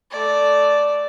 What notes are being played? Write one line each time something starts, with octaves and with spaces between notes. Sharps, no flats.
A3 D5